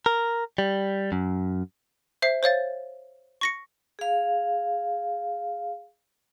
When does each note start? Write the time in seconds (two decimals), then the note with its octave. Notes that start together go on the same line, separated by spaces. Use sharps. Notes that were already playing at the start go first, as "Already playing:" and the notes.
0.06 A#4
0.58 G3
1.12 F#2
2.22 C5 E5 C7
2.43 C5 C#5 F5 A6
3.41 C#6 A#6 C#7
3.99 G#4 F5